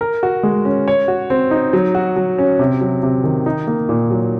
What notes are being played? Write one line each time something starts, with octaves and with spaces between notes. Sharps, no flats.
A#4
F#4
G#3
C#4
C#5
F#4
C4
D#4
F#3
F#4
F#3
C#4
C3
F#3
C3
D#3
D#4
A#3
A#2
F#3